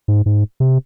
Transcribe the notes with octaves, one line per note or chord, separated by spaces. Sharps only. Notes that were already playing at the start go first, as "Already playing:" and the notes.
G#2
G#2
C3